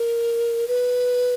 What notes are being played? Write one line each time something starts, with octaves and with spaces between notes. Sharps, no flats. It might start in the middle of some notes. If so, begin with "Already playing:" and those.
Already playing: A#4
B4